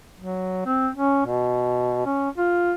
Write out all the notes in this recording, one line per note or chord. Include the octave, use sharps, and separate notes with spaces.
F#3
C4
C#4
B2
C#4
F4